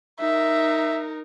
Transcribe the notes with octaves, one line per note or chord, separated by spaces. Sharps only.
D#4 A#4 E5